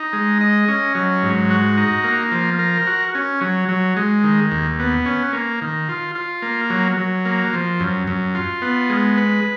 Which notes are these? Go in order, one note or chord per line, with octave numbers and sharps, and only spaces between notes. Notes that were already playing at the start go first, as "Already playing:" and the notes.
Already playing: D#4
G#3
D#5
C#4
F#3
G#2
F#4
D#4
A#3
F3
A#4
F#4
C#4
F#3
F#3
G#3
D#3
D#2
B3
C#4
A#3
D#3
F4
F4
A#3
F#3
F#3
A#3
F3
F#2
F#2
F4
B3
G#3
B4